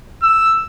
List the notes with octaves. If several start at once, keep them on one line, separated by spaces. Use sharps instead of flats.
E6